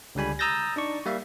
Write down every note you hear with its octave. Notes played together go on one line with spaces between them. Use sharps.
C#2 D3 G3 G#5 B5
A#5 D#6 E6 G6 A6 A#6
D4 D#4 D5 C#6
G3 A#3 E5 F5